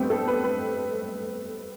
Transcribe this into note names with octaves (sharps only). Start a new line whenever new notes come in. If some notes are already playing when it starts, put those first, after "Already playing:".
Already playing: G3 A3 B3 C4
A4
B4
B4